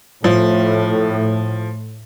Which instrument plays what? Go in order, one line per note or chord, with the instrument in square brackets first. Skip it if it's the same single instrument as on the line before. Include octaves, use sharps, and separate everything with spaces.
[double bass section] A2 [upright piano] F3